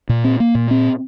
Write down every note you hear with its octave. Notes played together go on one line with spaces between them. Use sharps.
A#2
C4
A#3
A#2
C4